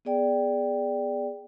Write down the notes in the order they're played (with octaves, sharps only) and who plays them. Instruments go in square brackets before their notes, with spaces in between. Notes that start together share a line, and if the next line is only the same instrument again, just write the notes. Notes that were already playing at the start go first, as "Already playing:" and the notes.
[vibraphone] B3 G#4 D5 G5